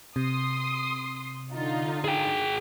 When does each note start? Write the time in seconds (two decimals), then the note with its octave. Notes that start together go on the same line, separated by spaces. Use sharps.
0.16 C3 C6 D#6 C7
1.53 D3 D#4 F4
2.04 G#4 G5